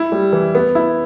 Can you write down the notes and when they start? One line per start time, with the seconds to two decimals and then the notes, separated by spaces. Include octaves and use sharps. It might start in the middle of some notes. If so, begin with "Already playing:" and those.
Already playing: E4
0.12 G3
0.33 E3
0.55 B3
0.75 E4